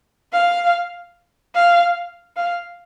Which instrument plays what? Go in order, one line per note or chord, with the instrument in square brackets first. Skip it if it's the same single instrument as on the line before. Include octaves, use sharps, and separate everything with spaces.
[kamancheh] F5
F5
F5